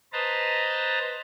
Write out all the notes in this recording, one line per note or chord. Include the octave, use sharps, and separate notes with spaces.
B4 C5 D#5 A5 A#5